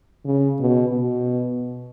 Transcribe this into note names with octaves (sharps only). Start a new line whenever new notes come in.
C#3
B2
B2